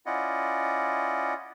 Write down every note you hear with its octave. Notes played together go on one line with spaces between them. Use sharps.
C#4 E4 F4 D5 D#5 F#5